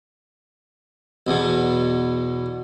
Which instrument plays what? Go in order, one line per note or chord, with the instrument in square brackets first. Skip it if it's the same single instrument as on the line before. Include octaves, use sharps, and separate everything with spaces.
[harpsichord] B1 E2 B2